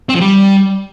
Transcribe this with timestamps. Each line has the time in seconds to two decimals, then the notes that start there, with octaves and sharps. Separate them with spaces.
0.09 C4
0.15 F3
0.21 G3